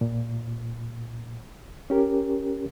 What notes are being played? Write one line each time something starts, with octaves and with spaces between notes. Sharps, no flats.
A#2
C#4 G4 A#4